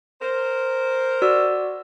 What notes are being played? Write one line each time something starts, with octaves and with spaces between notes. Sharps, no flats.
A#4 C5
F#4 D5 E6